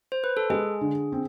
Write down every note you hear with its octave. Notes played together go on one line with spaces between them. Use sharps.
C5
B4
A4
G#3 G#4
D3
C4